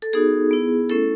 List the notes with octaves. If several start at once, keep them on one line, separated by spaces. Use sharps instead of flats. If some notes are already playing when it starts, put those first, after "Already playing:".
A4
B3 D#4 F#4 G#4
B3 E4
A3 C#4 E4 A4